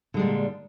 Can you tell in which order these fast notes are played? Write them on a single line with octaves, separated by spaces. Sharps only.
D3 G#3 G3 A#2